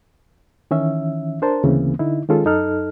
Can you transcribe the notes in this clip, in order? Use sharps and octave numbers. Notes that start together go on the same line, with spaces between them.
D#3 E3 C#4 E5
D4 A#4 C5 A5
D2 C#3 E3 A#3 C4 C#4
D3 D#4 E4
D#3 G#3 C#4 F4 G#4 A4
F#2 D#4 A4 F6